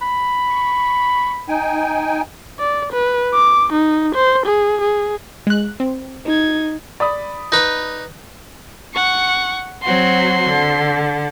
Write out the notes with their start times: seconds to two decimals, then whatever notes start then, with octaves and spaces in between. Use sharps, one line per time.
0.02 B5
0.49 C#6
1.48 D#4 G5 G#5
2.59 D5
2.93 B4
3.34 D6
3.73 D#4
4.15 C5
4.46 G#4
4.81 G#4
5.47 G#3 F#6
5.80 C4
6.26 D#4 G#6
7.00 D5 B5 D#6
7.52 D#4 B4
8.94 F#5 C#6
9.83 F#3 C4 F#4 C6
10.48 D3